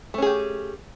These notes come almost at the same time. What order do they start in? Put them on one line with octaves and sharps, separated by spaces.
A3 C#4 G#4 G4